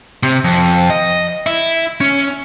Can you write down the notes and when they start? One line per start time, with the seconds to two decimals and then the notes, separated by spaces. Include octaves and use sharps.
0.23 C3
0.45 F2
0.90 D#5
1.46 E4
2.01 C#4